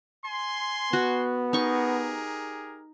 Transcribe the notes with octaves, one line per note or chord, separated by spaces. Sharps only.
G#5 C6
B3 F#4
D#4 G4 G#4 A#4 C#6